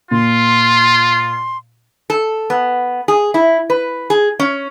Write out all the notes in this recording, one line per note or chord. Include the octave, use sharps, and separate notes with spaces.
A#2 F4 C6
A4
B3
G#4
E4
B4
G#4
C#4